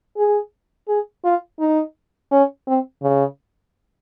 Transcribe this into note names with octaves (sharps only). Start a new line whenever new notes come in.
G#4
G#4
F4
D#4
C#4
C4
C#3